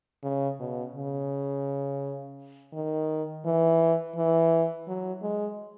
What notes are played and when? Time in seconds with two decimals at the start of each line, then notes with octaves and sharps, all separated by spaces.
0.24 C#3
0.60 B2
0.95 C#3
2.73 D#3
3.45 E3
4.16 E3
4.88 F#3
5.22 G#3